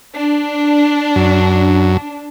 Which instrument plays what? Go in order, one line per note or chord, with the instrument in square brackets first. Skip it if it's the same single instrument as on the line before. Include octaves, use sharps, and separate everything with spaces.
[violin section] D4
[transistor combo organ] F#2